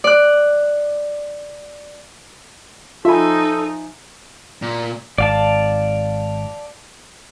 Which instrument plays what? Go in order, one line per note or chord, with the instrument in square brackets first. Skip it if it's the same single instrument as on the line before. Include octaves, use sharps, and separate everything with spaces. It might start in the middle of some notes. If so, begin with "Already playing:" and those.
[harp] D5 F#6
[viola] F3 D#4 [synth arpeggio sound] F4 B5 [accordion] A4 [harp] E5 G#5
[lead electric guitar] A#2
[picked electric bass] G#1 [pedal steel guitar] D5 F5 A5